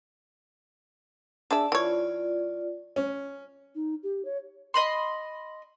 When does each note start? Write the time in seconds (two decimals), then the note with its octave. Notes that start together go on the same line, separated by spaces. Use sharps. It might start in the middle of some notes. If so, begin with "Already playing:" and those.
1.51 D4 G#4 D5 E5 A5
1.72 E3 F4 C#5 D5
2.96 C#4
3.75 D#4
4.03 G4
4.25 C#5
4.74 D#5 B5 C6